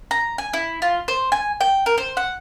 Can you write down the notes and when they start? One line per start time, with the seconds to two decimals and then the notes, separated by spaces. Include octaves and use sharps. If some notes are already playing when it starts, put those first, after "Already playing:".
0.11 A#5
0.38 G#5
0.53 E4
0.82 F4
1.08 C5
1.32 G#5
1.61 G5
1.86 A#4
1.98 C5
2.17 F#5